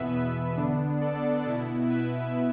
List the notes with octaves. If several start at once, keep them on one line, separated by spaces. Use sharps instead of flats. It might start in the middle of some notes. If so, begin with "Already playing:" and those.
Already playing: E2 B2 B3 B4 E5
B4 E5
D3 B3 D4
A4 D5
B2 B3 E4
B4 E5